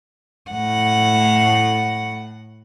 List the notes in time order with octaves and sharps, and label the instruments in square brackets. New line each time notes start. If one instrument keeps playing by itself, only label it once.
[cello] A2 F#5